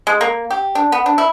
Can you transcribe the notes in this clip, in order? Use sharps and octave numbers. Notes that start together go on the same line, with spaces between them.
G#3
A#3
G4
D4
B3
D4
E4